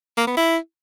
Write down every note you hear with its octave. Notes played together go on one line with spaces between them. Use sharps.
A#3
B3
E4